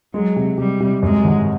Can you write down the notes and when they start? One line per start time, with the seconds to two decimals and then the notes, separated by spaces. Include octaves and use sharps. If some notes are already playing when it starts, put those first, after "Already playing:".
0.13 F#3 G#3
0.36 C3
0.58 C3 G3
0.80 C3
1.03 F#2 G#3
1.24 G#1